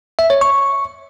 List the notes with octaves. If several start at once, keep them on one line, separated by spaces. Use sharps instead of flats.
E5
C#5
C#6